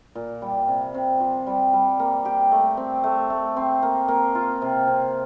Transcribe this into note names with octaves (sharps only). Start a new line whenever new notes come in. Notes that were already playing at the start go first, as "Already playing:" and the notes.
A#2
G3
C3
C3
F3
G3
G3
A#3
G4
A3
C4
A3
A3
C4
A#3
A#3
F4
C3
C3